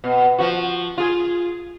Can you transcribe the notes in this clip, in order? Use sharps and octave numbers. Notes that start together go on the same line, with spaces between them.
B2
F3 F#4
F4 G#4